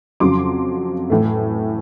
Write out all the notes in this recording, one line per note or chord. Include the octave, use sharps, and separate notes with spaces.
F2 C#3 F#3 C6 D6
A2 E3 A3